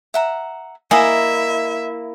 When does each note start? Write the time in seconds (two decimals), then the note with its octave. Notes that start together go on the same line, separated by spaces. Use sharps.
0.14 E5 F#5 A#5
0.91 A#3 E4 D#5 E5 G#5